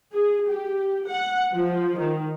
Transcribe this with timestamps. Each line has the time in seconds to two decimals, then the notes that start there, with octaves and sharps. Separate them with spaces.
0.13 G#4
0.48 G4
1.08 F#5
1.54 F3
1.97 D#3